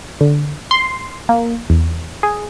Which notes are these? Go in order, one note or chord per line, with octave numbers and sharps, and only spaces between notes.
D3
C6
A#3
E2
G#4